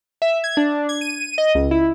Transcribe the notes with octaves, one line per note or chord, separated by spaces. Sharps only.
E5
G#6
D4
G#6
D#7
D#5
C#2
E4